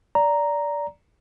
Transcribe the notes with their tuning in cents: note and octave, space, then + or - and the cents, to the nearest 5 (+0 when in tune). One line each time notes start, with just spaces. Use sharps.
D5 -15 A#5 +0